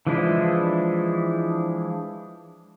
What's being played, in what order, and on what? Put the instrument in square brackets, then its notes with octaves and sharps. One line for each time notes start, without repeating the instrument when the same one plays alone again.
[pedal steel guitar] E3 F3 G#3 D4 E4